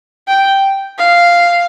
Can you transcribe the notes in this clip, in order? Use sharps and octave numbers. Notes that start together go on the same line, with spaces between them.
G5
F5